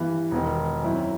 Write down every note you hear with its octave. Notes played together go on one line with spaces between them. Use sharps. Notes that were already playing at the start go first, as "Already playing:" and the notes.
Already playing: G2 E3 B3
E1 E2 D#3
F#2 F#3 C4 E4